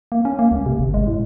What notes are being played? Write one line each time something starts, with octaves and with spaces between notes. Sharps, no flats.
A#3
C#4
A#3
C#2
C3
G1
G#3
A2